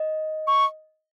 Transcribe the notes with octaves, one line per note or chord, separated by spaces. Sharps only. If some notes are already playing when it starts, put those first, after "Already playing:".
Already playing: D#5
C#6